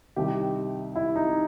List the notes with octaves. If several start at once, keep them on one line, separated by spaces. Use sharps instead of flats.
C2 C3 D#3 G4
E4
D#4